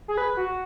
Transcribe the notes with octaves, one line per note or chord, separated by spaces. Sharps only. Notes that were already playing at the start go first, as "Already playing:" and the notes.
G#4
B4
F#4